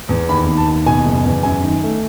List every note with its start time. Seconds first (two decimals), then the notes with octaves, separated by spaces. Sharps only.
0.09 E2
0.29 D#2 B5
0.47 D#3
0.57 A5
0.67 D#2
0.86 B2 G#5
1.06 F#1
1.25 E2
1.43 F#2 G#5
1.63 D#3
1.83 A3